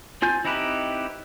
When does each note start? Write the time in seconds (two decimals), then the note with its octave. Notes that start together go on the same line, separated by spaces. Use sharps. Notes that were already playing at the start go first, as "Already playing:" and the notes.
0.22 C4 F4 G#5 G6
0.45 C4 D#4 E4 G4 B4